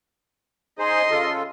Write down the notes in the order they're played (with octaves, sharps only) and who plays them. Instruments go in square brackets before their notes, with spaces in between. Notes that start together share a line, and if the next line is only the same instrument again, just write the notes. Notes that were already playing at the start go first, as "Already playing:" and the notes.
[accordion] D#4 G#4 C5 [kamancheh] D#5 C6
[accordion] C#3 F4 A4